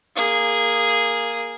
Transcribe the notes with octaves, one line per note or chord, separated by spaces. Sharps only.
A#3 G#4